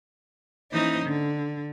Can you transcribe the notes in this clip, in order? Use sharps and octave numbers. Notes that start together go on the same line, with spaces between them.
E3 A#3 C#4 D#4 C5 D#5
D3